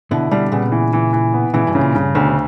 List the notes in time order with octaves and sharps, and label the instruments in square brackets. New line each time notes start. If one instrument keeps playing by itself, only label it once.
[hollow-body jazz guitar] B2 D3 [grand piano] E4
[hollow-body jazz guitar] B2 D3 [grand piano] G3
[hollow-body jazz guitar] A#2 C#3 [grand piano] B3
[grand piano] E3
E3
E3
B3
[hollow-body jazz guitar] A#2 C#3 [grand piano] E3
[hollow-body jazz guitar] G2 B2
[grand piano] C#3
[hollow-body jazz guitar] A#2
[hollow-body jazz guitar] G2 [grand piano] C#3
[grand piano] D2 [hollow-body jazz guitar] B2 D3